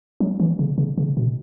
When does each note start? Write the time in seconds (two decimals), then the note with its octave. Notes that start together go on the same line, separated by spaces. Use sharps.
0.20 F#3
0.40 E3
0.59 C#3
0.78 C#3
0.98 C#3
1.17 B2